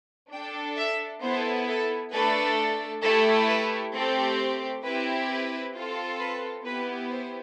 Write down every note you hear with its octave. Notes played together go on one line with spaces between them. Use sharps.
D4 A4 G5
E5
B3 E4 A4 C5
A4
A3 D4 A4 B4
A3 E4 G4 A4
B4
A3 C4 G4 A4
C4 E4 G4 B4
B4
C4 F4 A4
B4
B3 E4 G4 B4
C5